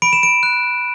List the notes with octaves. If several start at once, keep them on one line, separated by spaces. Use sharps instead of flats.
B5 D7
E7
D7
F#6